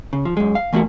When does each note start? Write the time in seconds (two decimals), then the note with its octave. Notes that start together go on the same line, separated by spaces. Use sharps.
0.13 C#3
0.25 F3
0.37 F#2 G#3
0.55 F5
0.73 E3 A3 A#3 D#4 F#4